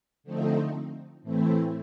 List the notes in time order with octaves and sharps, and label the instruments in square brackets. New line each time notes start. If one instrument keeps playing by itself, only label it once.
[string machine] D3 F3 A3 C4 D#4
A2 E3 A3 C4 E4